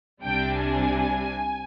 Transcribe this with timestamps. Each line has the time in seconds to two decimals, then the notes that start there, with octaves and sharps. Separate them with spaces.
0.23 C2 C3 G3 D4 G5
0.56 G#5